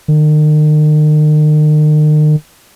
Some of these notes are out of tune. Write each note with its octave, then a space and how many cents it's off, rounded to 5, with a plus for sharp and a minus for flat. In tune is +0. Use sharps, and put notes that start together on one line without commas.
D#3 -40